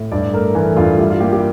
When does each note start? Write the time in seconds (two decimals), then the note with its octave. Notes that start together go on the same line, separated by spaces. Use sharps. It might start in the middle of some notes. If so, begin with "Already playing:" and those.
Already playing: A2
0.12 G2 D5
0.33 A3 A#4
0.55 E3 A4
0.77 G2 F4
0.99 G3 E4
1.10 F4
1.20 A#3 G4
1.32 G4